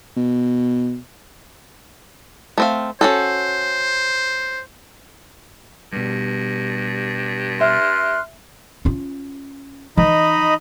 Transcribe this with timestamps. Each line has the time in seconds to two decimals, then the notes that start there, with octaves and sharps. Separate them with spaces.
0.17 B2
2.58 A3 C4 F5
3.01 C#4 F#4 A4 C5
5.93 G2 B2 G3
7.61 E5 C6 F6 F#6
8.85 C#4 F4
9.98 E3 D#4 D#5 B5